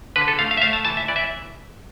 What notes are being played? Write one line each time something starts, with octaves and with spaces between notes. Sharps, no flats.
D3 B4
A4
A3 F5
F5
E5
A3 F5
A5
E3 A5
E5
E3 D5
E5